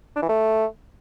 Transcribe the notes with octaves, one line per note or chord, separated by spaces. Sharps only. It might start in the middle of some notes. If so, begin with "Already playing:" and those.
D4
E3
A3